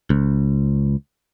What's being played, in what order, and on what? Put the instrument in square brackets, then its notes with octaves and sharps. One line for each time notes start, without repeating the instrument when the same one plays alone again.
[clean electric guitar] C#2